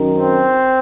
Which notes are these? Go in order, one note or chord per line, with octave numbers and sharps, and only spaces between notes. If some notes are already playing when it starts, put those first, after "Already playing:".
Already playing: F#2 D#3
C4